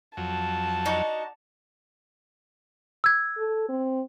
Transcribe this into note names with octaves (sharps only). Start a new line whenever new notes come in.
F2 F#3 A5
D4 D#4 F#4
E6 G#6
A4
C4